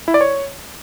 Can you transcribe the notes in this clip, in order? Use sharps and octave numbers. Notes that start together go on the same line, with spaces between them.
E4
D5
C#5